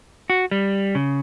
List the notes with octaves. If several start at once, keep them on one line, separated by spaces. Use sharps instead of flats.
F#4
G3
C#3